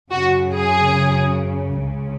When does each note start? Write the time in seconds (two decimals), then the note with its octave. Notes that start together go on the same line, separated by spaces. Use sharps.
0.11 F#2 C#3 F#4
0.53 G#4
1.81 C#2 C#3